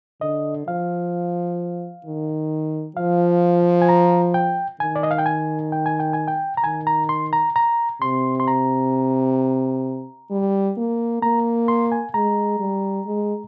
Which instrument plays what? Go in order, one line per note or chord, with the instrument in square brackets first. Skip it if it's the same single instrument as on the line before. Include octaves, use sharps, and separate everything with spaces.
[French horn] D3 [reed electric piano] D#5
[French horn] F3 [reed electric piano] F5
[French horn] D#3
[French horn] F3 [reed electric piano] F5
[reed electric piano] G#5
A#5
G5
[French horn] D#3 [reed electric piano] G#5
[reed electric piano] D5
D#5
F5
G5
G#5
G5
G#5
G5
G#5
G5
A#5
[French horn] D#3 [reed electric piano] G#5
[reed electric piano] A#5
C6
A#5
A#5
[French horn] C3 [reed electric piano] C6
[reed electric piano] C6
A#5
[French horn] G3
A#3
[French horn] A#3 [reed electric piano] A#5
[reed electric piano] C6
G#5
[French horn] G#3 [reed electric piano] A#5
[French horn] G3
G#3